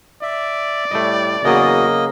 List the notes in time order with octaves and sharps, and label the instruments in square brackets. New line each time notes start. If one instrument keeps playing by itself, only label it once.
[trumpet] D5 [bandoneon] E5
[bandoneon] A2 G3 [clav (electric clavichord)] A3 D#5
[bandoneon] E2 F#4 D#6 [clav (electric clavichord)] C#3 F#3 [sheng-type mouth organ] A#3 D#5